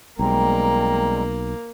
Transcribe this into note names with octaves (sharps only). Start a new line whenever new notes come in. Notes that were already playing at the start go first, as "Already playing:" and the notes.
B1 G3 G#3 A#3 C4 A#5